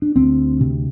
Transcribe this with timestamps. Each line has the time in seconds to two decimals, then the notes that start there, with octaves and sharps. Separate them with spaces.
0.02 D4
0.16 D2 C4
0.61 C3